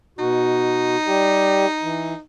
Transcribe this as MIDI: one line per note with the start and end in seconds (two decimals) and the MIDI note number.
0.19 0.96 47
0.19 2.21 63
0.19 0.96 66
1.07 1.66 55
1.07 1.66 67
1.83 2.14 52